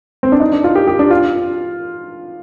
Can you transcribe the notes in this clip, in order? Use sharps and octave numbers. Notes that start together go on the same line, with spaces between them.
C4
D4
D#4
D4
F4
G4
G4
D4
F4